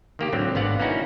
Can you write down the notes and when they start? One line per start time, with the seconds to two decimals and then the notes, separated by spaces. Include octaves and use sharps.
0.19 D#3 A#3 G4
0.33 A2 D3 F#3 C4
0.55 G#1 D3 B3 F5 F#5
0.79 A#3 B3 C#4 D#4 E4 F#4